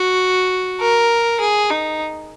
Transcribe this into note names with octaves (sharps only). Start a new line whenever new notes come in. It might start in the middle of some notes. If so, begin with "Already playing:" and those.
Already playing: F#4
A#4
G#4
D#4